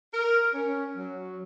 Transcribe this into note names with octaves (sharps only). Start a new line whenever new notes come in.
A#4
C#4
F#3